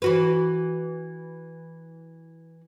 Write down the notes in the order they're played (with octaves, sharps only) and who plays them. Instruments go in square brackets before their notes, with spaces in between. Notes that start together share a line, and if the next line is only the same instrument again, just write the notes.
[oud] E3 F#4 B4